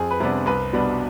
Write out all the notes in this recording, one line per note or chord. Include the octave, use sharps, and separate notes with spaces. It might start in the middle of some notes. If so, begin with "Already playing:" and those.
Already playing: F2 G#4
B4
C3 G3 B3 D4
C2 B4
B2 G3 B3 D4